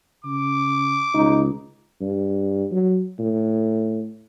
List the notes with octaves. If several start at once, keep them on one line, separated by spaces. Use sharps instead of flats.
C#3 D6
C#2 D#4
G2
F#3
A2